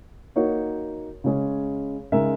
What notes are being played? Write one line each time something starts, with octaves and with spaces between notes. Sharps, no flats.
A#3 D#4 F#4 C#5
C#3 G#3 C#4 G#4
C#3 G#3 D#4 A#4 E5